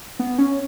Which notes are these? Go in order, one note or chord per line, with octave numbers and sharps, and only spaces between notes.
B3
C#4